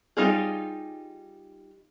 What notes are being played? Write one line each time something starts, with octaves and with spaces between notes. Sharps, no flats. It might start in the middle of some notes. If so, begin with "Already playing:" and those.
G3 D#4 F4 G#4